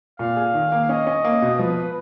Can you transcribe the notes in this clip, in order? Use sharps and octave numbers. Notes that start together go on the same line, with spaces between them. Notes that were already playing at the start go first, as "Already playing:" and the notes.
A#2 F5
G#4
D#3
A#3
C#4 D#5
C#4
A#3
B2
F3 B4